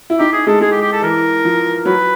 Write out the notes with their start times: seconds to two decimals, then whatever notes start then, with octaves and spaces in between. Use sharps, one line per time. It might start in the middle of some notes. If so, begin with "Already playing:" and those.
0.10 E4
0.19 D#4 G4
0.32 G#4
0.47 G#3 A4
0.61 G#3 G#4
0.71 G4
0.82 G4
0.92 A4
1.02 E3 A#4
1.45 F3
1.85 F#3 B4